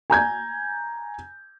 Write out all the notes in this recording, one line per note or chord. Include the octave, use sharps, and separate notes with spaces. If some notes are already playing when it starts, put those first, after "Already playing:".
G#5 A#5 G6 G#6